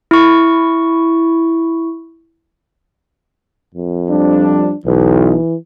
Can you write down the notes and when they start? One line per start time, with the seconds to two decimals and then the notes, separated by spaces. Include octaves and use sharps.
0.11 E4 C#6
3.74 F2
4.10 F3 G3 D4
4.85 B1 E3